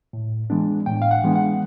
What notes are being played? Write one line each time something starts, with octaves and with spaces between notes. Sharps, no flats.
A2
E3 G#3 B3 D4
A2 G5
F5
F#5
E3 G#3 B3 D4
F#5